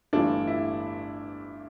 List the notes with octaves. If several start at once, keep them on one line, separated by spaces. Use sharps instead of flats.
G1 G2 E3 A3 D4
E4